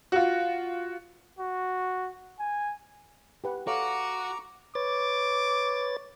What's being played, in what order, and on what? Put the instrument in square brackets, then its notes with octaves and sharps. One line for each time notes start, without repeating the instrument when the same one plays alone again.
[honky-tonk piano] F4 F#4
[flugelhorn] F#4
G#5
[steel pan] G4 B4 F#5
[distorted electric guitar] F#4 [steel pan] A4 C#5 F5 [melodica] A#5 C#6 D6
[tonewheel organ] B4 C#5 A6 [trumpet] D6